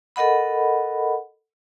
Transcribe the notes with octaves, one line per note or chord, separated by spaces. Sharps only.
A4 A#4 D#5 F#5 B5